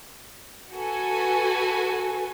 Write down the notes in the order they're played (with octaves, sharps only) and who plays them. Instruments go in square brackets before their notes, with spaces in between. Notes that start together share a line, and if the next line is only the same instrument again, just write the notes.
[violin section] F#4 A4 B4 G#5